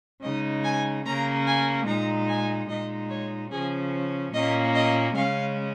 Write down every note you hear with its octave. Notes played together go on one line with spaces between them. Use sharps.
C#3 G#3 D#4 D#5
G#5
C#3 A#3 C#4 A#5
G#5
A#2 G#3 D#4 A#5
G#5
A#2 G#3 D#4 D#5
C#5
C#3 F3 C#4 G#4
A#2 A#3 C#4 D#5
D#5
C#3 G#3 C#4 F5